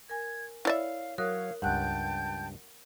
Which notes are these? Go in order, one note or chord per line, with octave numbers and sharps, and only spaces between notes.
A#4 G#5 G#6
E4 C#5 D5 E5 F5 E6
F#3 A#4 C#5 F5 D#6 F#6
C#2 G2 F#5 G5 A5 F#6 G6